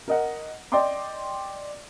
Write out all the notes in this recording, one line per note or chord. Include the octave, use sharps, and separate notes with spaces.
A#4 D#5 F#5
D5 D#5 G5 C6 D6